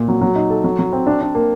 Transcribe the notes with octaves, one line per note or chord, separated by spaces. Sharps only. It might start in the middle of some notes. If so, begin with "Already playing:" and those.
Already playing: A#2
F#3
F#3
D#4
A4
F#3
F#3
C4
D4
D4
A#3